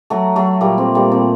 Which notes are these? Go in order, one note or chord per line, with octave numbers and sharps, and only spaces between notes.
F#3 A3
F#3 A3
A#2 G3 A#3
A3 C4
G3 A#3
A3 C4